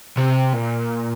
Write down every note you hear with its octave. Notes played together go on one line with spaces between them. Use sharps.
C3
A#2